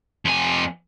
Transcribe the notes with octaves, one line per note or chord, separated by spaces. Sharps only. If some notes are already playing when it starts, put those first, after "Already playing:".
F2 G#5